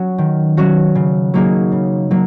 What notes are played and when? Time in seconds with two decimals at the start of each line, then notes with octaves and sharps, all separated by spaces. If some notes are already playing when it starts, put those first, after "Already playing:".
Already playing: F#3 C#4 F#4
0.18 D#3
0.57 F#3 C#4 F#4
0.95 C#3
1.34 F#3 A#3 D#4 G#4
1.72 C#3
2.11 F#3 A#3